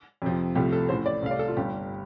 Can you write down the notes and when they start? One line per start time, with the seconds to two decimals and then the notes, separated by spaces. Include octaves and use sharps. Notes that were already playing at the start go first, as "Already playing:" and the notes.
0.22 F2 C3 F3
0.55 C2 C3 F3 A3 G4
0.72 A4
0.89 A1 A2 A3 C5
1.06 D5
1.22 C2 C3 A3 F5
1.31 D5
1.39 A4
1.48 F4
1.57 G1 G2 G3 G4